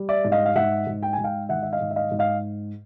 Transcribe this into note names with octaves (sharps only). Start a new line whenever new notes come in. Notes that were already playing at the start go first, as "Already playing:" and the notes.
Already playing: G3
D5 E5
G#2
D#5 F5
F5
G#2 E5 F#5
G#2
G5
G#5
G#2
F5 G5
D#3 E5 F#5
E5
D#5 F5
G#2
E5
D#5 F5
G#2
D#5 F5